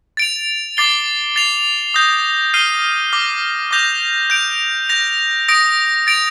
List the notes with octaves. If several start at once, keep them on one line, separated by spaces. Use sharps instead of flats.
A6 D7 F7
D6 A6 C7 G7
A6 C7 F7
D#6 G6 A#6
F6 C7 D#7 G7
D6 F6 A#6
D6 G6 A#6 F7
G6 D7 F7
G6 A#6 F7
D#6 A#6 D7
A6 D7 F7